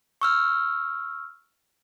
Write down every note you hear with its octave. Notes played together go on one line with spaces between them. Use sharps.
C#6 E6 F6